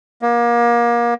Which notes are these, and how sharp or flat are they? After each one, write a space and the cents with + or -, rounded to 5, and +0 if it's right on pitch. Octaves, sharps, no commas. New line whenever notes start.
A#3 +30